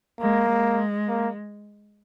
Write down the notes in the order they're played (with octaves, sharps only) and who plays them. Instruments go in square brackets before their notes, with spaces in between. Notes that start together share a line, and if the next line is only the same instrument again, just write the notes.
[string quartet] G#3 [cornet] A#3
[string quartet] G#3
[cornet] A#3